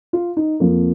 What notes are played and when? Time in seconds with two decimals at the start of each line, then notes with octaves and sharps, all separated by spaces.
0.13 F4
0.37 D#4
0.60 F2 F3 A#3